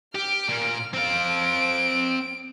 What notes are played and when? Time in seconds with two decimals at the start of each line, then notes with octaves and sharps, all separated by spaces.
0.15 G4 F6 D7
0.49 A#2
0.94 C4 F5 D7